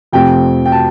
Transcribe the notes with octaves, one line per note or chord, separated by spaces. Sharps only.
F2 C3 A3 C4 G5
G5
A5